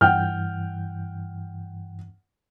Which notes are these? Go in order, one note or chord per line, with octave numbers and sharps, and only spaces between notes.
G2 E3 F#5 G5 F6 G6